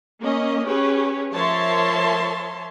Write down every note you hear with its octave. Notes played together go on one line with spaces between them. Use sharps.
A#3 C#4 D#5
C#4 G4 G#4 B4 C#5
F3 A#4 C#5 E5 A5 C6